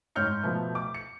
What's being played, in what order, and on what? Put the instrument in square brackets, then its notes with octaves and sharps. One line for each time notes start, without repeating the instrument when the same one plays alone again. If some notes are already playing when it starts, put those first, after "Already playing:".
[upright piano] G#2 C#5 F6 G6 C#7
B2 F3 A3
D6
C#7